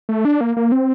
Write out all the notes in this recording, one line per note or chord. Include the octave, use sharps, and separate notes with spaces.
A3
D4
A#3
A#3
C4